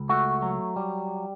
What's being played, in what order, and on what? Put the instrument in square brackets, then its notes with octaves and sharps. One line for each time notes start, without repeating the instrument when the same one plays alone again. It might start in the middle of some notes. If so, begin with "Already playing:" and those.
Already playing: [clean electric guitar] C#2
A3 F#4
F#3
G3